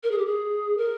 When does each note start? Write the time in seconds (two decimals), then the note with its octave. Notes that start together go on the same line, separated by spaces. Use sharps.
0.03 A#4
0.11 G#4
0.18 G4
0.26 G#4
0.78 A#4